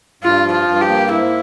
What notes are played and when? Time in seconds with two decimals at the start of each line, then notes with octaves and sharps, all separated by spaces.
0.22 G2 F4
0.45 F3
0.52 F4
0.68 G2
0.81 G4
0.89 A#3
1.11 G#2 E4